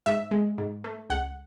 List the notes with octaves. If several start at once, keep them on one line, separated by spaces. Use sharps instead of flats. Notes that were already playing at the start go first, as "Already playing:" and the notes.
G#2 E5
G#3
G#2
A3
C#2 F#5